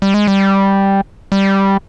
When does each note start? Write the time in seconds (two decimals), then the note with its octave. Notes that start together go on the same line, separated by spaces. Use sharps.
0.02 G3
0.14 G#3
0.27 G3
1.32 G3